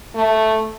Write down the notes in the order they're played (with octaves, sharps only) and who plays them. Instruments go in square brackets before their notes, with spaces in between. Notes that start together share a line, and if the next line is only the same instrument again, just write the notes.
[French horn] A3